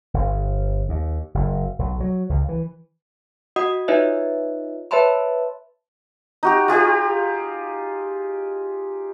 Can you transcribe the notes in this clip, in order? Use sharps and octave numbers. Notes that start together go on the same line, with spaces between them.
G1
D#2
F#1
B1
F#3
C#2
E3
F#4 D#5 F#5 D#6
D#4 F4 B4 C#5 D#5 E5
B4 C#5 E5 A5 B5 C6
D#4 F#4 G4
F4 G4 G#4 D#5